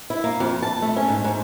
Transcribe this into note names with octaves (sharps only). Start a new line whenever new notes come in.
E4
A#3
F2
A5
A3
C#4
G#2
G#2